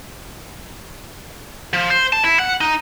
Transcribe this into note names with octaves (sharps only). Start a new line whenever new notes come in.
F3
C5
A5
E4
F#5
D#4